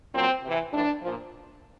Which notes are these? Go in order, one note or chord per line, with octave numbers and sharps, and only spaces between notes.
A#2 F#3 C4
C3 E3
A2 E3 D4
A#2 F3